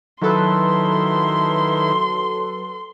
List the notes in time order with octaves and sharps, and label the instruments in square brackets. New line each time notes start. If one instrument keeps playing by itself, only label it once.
[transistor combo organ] D#3 E4 [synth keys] F#3 A4 B4 [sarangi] C6